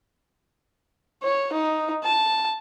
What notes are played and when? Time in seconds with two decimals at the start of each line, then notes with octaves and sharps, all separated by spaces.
1.23 C#5
1.53 D#4
2.04 A5